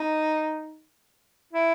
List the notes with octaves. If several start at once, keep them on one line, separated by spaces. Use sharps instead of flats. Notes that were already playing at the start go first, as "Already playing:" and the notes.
Already playing: D#4
E4